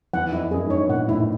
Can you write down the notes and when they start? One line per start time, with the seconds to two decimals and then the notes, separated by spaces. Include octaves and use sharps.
0.13 E2 F#5
0.33 F2 E4
0.48 F2
0.51 F#2 G#4
0.64 G#2
0.70 G2 C#5
0.89 A#2 F#5
1.09 A2 E4